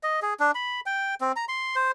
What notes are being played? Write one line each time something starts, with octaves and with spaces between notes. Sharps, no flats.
D#5
G#4
D4
B5
G5
C4
A#5
C6
C5